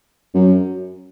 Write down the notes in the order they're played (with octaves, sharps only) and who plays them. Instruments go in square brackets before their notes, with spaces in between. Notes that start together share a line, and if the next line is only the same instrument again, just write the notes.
[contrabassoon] F#2